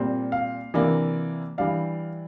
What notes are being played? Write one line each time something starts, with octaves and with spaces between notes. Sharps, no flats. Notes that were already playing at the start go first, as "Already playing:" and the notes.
Already playing: A#2 G3 C4
F5
C3 E3 A#3 D4
E3 G3 D4 F5